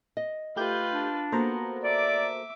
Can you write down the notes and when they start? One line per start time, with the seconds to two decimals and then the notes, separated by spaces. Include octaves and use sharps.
0.17 D#5
0.56 A3 F4 G4 B4 G6
0.93 D4
1.32 A#3 B3 F#4 A4 C5 A#5
1.84 D5 E5 D6